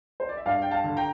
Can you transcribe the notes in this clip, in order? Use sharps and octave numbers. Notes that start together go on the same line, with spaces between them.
C5
D5
E5
G2 D5 F5
G5
F5 A5
D3
G5 A#5